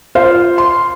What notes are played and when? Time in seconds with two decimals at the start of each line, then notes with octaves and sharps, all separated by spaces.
0.15 F4 C5 F5
0.58 C6